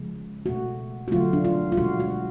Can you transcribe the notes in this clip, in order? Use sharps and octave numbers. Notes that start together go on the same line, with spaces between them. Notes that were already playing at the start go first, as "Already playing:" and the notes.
Already playing: C#3 F3 G#3
B2 A3 F#4
F#4
D3 F#3 A3 F4
D4
F4
F4
B2 G#3 F#4
F#4